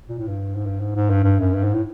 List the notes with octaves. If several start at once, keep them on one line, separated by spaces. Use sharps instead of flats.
A#2
A2
G2
G#2
G2
G#2
G#2
G2
G2
F#2
G2
G#2
A2